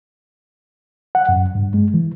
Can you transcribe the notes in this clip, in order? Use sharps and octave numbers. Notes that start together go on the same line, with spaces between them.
F#5
F#2
G2
G#3
E3